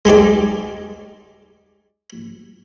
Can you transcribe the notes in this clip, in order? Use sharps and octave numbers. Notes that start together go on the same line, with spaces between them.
G#3 D#4 G4 D5